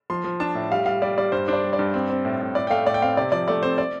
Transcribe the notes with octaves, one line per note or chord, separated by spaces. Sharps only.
F3 C6
F3
D4 A5
A2
G3 F5
G3 F5
G3 D5
G3 D5
G2 C5
D4 C5
D5
G3
D5
G2
C4
C4
A2
A2
A2 D5
G5
A3 F5
A2 D5
G5
C4 F5
C3 D5
F3 D5
A3 D5
C4 C5
D5